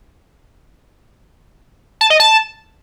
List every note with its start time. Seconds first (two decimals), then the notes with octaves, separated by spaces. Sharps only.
2.01 A5
2.10 D#5
2.20 A5